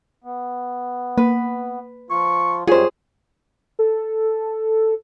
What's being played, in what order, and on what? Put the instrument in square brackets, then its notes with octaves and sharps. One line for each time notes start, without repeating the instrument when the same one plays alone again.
[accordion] B3
[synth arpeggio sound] A#3 [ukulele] B4
[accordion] F3 F4 [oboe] C#6
[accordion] F#2 G3 C#5 [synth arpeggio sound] F4 [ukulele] G#4 C5
[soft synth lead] A4